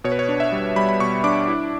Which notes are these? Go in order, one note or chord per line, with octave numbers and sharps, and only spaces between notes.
B2 C#5
B4
C#5
D4
E5
G3
G3 B5
B5
B2 C#6
D4 D6
E4